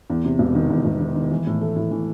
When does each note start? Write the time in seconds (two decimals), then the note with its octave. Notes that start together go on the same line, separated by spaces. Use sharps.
0.10 E2
0.25 C3
0.39 E1
0.55 D#3
0.70 E2
0.85 E1
1.00 D#3
1.15 D#3
1.31 E3
1.47 A2
1.61 A3
1.76 A2
1.91 E3